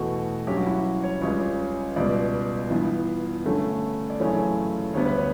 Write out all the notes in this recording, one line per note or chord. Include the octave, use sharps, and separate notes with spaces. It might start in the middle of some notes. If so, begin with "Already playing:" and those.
Already playing: E2 B2 A3 F#4
G2 F#3 C#4 G4
F#4
E4
C#5
C#2 C#3 G3 C#4 C#5
C#2 B2 G3 B3 D5
G2 E3 B3
G2 D3 A3 C#4
D5
F#2 C#3 E3 A3 C#4 C#5
D2 D3 G3 B3 C#5
B4
C#5